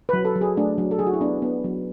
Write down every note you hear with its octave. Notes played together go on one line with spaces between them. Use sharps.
B4
F#3
A4
F#3
G#4
A3 D4
F#3
A4
F#3 G#4
F#4
E4
B3 D4
B3
F#3